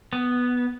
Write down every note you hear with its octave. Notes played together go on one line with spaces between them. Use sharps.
B3